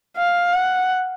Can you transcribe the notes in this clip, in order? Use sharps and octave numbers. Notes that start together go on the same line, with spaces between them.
F5
F#5